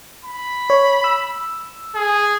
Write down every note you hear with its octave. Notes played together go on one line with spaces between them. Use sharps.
B5
C#5
E6
G#4